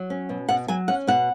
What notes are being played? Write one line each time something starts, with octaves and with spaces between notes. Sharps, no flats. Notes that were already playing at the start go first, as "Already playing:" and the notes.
Already playing: F#3
C#4
B2
B2 F#5
F#3 G#5
C#4 F#5
B2 F#5